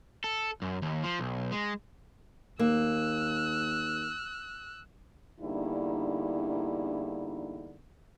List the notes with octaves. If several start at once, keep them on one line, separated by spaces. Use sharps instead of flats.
A4
F#2
D#2
F3
B1
G#3
D#2 A#3 E6 F#6
E2 G2 D3 A#3 D#4 E4